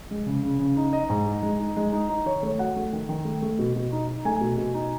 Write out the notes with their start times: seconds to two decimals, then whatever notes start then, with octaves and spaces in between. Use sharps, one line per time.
0.11 G#3
0.26 C#3
0.43 C#3
0.59 C#3
0.77 D#4
0.93 D#4 D#5
1.10 G#2
1.26 D#4
1.42 G#3
1.59 D#4
1.76 G#3
1.92 D#4
2.09 D#4
2.26 D#3 C#5
2.43 A3 C#5
2.59 F#3 F#5
2.76 A3
2.93 D#3
3.09 D#3
3.25 A3
3.42 A3
3.59 B2
3.75 B2
3.92 D#4
4.08 D#4
4.25 A3 G#5
4.41 B2
4.57 B2
4.74 D#4